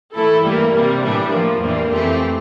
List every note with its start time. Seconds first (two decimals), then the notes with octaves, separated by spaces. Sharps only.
0.13 E3 A3 E4 A4
0.43 G2 E3 G3 A#3
0.72 C3 G3 A#3
1.01 A2 E3 G3 D4
1.31 A2 F3 A#3
1.60 E2 E3 G3 A#3 D4
1.90 F2 E3 A3 C4 G4